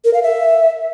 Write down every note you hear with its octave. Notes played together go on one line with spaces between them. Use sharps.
A#4
F5
E5